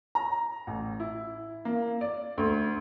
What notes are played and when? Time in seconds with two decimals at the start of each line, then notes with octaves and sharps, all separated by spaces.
0.15 A#5
0.67 A1
1.00 E4
1.65 A#3
2.01 D5
2.38 D2